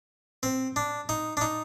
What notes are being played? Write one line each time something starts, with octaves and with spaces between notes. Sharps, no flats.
C4
D4
D#4
D4
D#4